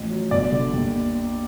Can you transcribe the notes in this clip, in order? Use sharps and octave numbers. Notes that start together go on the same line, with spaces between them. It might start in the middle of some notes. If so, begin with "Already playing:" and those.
Already playing: A1 F3
F#3
G1 D5
D3
D#2